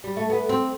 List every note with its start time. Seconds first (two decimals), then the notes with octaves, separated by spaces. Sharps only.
0.04 G3
0.17 A3
0.30 B3
0.49 C4